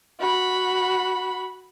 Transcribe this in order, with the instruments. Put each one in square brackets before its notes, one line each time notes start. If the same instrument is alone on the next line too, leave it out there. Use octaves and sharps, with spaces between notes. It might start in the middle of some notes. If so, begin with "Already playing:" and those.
[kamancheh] F#4 B5